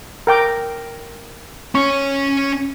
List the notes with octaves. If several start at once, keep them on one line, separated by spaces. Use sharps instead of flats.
A#4 G5 D6
C#4 C#5 C#6